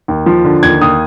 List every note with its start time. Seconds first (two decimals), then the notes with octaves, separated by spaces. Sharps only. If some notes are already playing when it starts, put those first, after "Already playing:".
0.08 D#2
0.26 F3
0.45 D3
0.63 D#2 G#6
0.81 D#2 D#6